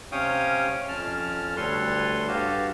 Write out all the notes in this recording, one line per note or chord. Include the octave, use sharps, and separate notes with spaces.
C3 C#4 C#5 F5 G5 D#6
F2 C#4 A5 F6
D2 G3 A4 B4 C#5 C6
G2 F#4 G4 F5 A5